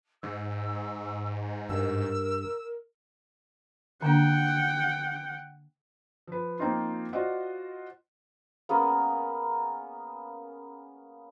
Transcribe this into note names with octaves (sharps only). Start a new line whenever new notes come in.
G#2 E6
G2 A#4 E6
D3 A#3 D4 F#5 G5
F3 B4
F3 A#3 C4 D#4 F4
F4 F#4 C5 D5 D#5 F#5
A#3 B3 C#4 G#4